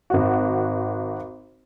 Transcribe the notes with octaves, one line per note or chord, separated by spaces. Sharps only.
G#1 F#4